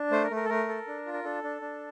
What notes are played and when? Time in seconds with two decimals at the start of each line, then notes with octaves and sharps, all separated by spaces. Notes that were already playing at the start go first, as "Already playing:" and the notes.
Already playing: D4
0.11 A3 C5
0.24 A#4
0.30 A3
0.36 A#4
0.45 A4
0.49 A3 A#4
0.69 A4
0.87 D4
1.06 F4
1.14 A#4
1.24 D4 A4
1.44 D4
1.61 D4